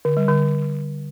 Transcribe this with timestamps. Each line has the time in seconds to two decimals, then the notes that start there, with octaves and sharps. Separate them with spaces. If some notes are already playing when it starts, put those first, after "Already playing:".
0.05 D3
0.17 G3
0.28 D3